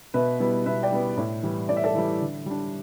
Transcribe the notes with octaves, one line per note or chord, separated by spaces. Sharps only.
B2 B4 E5
G3 B3 E4
B2 B4 E5
D5 G5
G3 B3 E4
A2
E3 G3
A2 D5
E5
A4 D5
E3 G3
D3
G3 D4